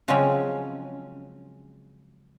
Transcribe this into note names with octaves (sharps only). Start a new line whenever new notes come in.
C#3 F3 F#3 G#3 C4 C#4